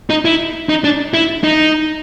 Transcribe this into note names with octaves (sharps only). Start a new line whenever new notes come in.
D#4
E4
D#4
D4
E4
D#4